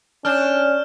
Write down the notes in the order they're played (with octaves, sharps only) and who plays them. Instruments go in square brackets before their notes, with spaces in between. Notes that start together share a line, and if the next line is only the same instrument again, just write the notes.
[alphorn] C#4 [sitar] D4 [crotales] F6 G6 E7